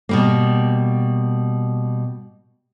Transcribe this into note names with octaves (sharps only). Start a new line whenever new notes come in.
B2 G3 A#3